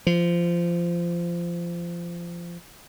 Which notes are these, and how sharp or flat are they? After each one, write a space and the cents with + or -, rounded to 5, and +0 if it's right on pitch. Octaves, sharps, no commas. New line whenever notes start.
F3 -20